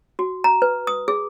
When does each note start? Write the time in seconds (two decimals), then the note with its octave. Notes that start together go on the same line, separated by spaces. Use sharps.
0.19 F#4
0.44 A#5
0.62 B4
0.87 D#6
1.08 G#4